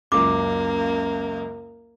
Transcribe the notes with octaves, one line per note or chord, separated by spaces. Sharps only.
C#2 F#2 A#3 D6